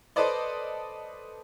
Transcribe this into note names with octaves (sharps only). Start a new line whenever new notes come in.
A4 B4 C5 D5 D#5